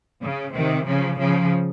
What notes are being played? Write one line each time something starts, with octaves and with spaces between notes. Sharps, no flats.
C#3
C3 D#3
C#3 F3
C#3 F3